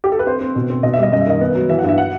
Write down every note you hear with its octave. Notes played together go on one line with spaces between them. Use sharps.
G4
A4
B4
C4 C5
C4
B2
C4
B2 D#5
E5
G3 D#5
F#2 D#5
E5
D#3 D#5
B3
F#3
E3 E5
F#5
G2
E5
F#5